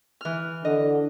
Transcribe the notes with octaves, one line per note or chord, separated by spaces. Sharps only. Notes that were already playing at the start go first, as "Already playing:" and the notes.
E3 F6
D3 D#5